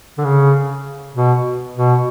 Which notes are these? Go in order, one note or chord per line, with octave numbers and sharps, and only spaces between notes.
D3
C#3
B2
B2